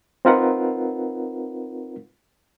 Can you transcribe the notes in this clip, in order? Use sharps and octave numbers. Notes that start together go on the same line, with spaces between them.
C4 D#4 F4 A#4 B4 F#5